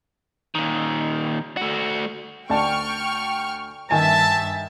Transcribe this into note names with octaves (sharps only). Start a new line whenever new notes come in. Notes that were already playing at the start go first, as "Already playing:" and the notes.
A#2 D#3
A3 F#4
D2 D4 G5 A5 C#6 F6
G2 D#3 E5 G#5 A5 A6